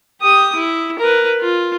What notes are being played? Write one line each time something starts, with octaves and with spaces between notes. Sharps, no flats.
G4 D#6
E4
A#4 B4
F4